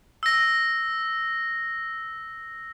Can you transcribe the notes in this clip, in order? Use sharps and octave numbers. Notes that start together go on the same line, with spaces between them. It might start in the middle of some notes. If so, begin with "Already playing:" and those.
E6 A#6